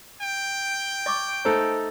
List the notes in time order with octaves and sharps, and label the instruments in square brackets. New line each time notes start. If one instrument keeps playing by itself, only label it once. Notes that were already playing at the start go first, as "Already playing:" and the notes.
[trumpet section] G5
[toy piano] D#5 C#6 D6
[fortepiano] A3 D#4 A4 [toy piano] C5